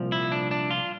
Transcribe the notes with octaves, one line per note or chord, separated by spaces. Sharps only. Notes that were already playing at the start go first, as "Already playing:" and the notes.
Already playing: C2 A#2 F3
E4
D4
D4
F4